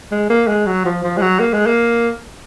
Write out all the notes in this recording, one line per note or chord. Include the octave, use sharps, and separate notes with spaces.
G#3
A#3
G#3
F#3
F3
F3
G#3
F#3
A#3
G#3
A#3